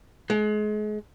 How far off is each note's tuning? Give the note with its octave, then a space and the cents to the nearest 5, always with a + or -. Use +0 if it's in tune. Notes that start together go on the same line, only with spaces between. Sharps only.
G#3 +35